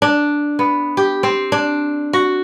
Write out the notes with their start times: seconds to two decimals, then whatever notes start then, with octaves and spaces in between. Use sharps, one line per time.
0.02 D4
0.59 B3
0.97 G4
1.23 C4
1.52 D4
2.13 F#4